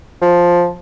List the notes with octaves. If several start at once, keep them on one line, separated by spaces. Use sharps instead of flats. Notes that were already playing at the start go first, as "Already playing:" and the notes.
F3